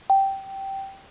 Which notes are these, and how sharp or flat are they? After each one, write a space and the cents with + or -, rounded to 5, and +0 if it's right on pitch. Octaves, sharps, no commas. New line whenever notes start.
G5 -10